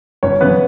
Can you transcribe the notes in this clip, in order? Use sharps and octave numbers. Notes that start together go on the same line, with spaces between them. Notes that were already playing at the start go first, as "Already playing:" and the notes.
G1 C#4 C#5
F#2 C#3 E3 B3 B4